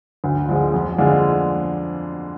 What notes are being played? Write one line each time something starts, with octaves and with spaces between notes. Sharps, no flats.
D2
D3 F3 G#3
F2
D3 G#3 D4 F4